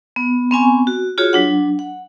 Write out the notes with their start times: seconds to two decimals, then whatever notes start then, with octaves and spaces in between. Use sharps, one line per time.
0.16 B3
0.51 B3 C4 G#5 C#6
0.87 F#4
1.18 F4 F#4 G#4 C#5
1.33 F#3 D4 F#5
1.79 F#5